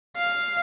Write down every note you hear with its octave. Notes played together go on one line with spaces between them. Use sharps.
F5